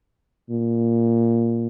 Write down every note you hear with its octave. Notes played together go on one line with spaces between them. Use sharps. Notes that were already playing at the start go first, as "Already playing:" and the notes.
A#2